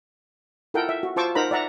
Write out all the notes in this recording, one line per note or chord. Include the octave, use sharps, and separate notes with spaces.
E4 F4 A4 A#4 F#5 G5
E5
F#4
F4 C5 A5 C#6 D6 E6
D#4 A#4 C5 F#5 A#5 B5
D5 E5 F#5 A#5